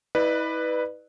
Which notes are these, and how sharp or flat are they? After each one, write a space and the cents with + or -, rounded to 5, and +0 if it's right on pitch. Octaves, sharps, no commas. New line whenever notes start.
E4 -35 B4 +0 D5 +35